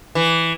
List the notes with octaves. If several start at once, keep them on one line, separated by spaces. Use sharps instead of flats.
E3